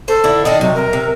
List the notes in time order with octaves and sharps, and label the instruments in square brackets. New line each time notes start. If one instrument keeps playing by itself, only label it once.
[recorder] A4 [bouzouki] C5
[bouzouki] D3 E4
[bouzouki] D#3 D4 A4 [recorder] D#5
[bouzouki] C3 [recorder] F#3
[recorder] A#4
[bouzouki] C3